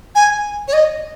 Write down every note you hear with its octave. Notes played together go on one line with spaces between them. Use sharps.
G#5
C#5
D#5